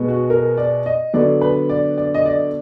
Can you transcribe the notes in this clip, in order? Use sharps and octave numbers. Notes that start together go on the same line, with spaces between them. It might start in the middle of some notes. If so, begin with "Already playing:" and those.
Already playing: B2 G#3 B3
F#4
A#4
D5
D#5
D3 F#3 B3 D4 D5
B4
D5
D5
D#5
D5